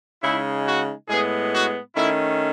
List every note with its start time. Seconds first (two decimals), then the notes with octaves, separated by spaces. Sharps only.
0.22 C#3 G#3 D#4 E4
0.66 F#4
1.08 A2 G#3 B3 G#4
1.52 F#4
1.95 D#3 A3 C#4 E4